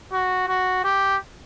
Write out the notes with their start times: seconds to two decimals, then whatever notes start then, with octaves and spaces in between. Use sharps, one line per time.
0.13 F#4
0.48 F#4
0.84 G4